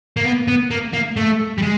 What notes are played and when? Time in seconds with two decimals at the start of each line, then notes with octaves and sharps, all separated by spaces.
0.17 A#3
0.24 B3
0.48 B3
0.71 A#3
0.93 A#3
1.17 A3
1.58 G3
1.62 G#3